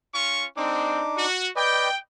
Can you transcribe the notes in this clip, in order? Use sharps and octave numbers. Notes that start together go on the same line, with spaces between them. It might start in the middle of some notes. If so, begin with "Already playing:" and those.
C#4 F4 C#6
G#3 C4 D4 D#4 D6
F#4
B4 D5 D#5 G5